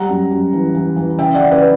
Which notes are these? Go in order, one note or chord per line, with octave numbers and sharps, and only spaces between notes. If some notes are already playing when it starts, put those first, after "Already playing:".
Already playing: G3 F#5 A#5
F#2
F#2
E3
E3
E3
C#3 E5 G5
D5 F#5
C#3
B4 D5